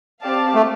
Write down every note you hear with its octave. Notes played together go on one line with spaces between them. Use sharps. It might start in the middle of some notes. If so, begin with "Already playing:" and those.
C4 G4 D5 F5 A5
A3